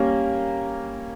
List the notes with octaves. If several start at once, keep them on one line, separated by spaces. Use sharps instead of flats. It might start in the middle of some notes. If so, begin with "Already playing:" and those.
Already playing: G3 A#3 C#4